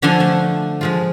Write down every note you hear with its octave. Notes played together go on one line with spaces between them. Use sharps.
D3 F3 D4 A4 G#5 C6
A3
F3 G#3 F4